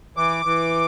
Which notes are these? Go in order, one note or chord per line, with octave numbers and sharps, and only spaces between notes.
E3 D6
E3